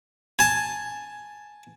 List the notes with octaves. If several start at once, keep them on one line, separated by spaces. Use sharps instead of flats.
G#5 A5